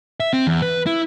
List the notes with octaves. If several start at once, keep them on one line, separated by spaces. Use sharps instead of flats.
E5
C4
E2
B4
E4